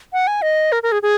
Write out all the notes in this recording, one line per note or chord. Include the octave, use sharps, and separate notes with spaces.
F#5
G#5
D#5
A#4
A#4
G#4
G#4